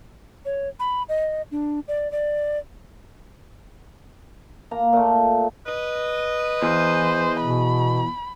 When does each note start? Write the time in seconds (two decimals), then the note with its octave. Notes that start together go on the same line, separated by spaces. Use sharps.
0.45 C#5
0.80 B5
1.09 D#5
1.51 D4
1.88 D5
2.12 D5
4.71 A#3 A#5
4.93 A#2 A3
5.66 B4 D#5
6.62 E2 E3 C5
7.41 B2 B5